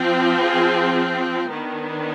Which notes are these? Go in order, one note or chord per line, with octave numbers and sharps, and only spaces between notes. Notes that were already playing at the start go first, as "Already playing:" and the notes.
Already playing: F3 C4
F4 G#4
D#3 B3 D4